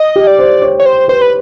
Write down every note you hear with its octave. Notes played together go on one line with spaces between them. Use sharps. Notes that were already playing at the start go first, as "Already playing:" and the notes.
Already playing: D#5
G4
D5
C5
C#5
C#5
C5
B4 C5
B4